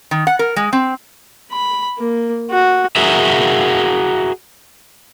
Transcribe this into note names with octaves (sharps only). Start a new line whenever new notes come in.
D#3
F#5
A#4
G#3
C4
B5
A#3
F#4
F#4 G#4 A#4 E5